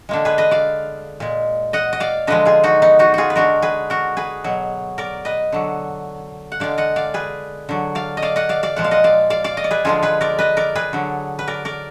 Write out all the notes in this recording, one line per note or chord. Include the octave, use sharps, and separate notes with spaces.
D3 G#3 A#3 D4
G#4 B4
B4 D#5
D5 F5
A#2 G#3
D#5 F#5
D#5
D5 F5
D3 F3 G#3 B4 D#5
F4 G#4
D#4 F#4
B3 D#4
D#4 F#4
F4 F#4 G#4
B4
D3 G#3 F#4 A#4
G#4 B4
F#4 A#4
G#4 B4
B2 F#3
A#4 D5
B4 D#5
D3 F#3
F#5
D3 G#3 D5 F5
D#5 F#5
D5 F5
G#4 B4
D3 F#3
D5 F5
D#5
D5 F5
D#5 F#5
D5 F5
D5 F5
A#2 F3 G#3 F#5
F5
D#5 F#5
D5 F5
D5 F5
D5 F5
D#5
D5
G#4 B4
D3 F3 G#3 F4 G#4
G#4 B4
A#4 D5
B4 D#5
A#4 D5
G#4 B4
D3 F#3
B4
A#4 D5
A#4 D5